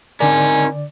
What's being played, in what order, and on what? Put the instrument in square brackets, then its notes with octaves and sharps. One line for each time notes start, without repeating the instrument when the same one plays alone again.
[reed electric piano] D3 D5 [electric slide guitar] C4 D#4 A#4 [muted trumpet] C#4 [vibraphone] G#5